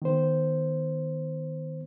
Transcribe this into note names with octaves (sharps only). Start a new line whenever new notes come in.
D#3 B3 C5